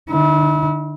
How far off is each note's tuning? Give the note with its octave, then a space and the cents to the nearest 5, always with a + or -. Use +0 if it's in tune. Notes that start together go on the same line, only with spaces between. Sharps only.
D3 +30 E4 -35